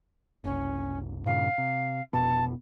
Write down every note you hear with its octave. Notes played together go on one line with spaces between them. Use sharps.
F#1 C2 C#4
G2 A#2 C#3 F5
C3
F1 B2 B3 A5